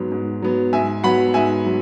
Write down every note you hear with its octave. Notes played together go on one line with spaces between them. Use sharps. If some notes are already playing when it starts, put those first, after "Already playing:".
Already playing: G#2 F#3 B3
G#2
F#3 B3
G#2 E5 G#5
F#3 B3 F#5 B5
G#2 E5 G#5
F#3